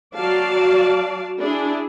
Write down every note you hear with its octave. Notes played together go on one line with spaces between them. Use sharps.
F#3 F#4 D5 F5 A5
D4 E4 G#4